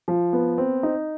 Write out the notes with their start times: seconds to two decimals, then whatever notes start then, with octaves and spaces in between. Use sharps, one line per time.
0.08 F3
0.33 B3
0.58 C4
0.83 D#4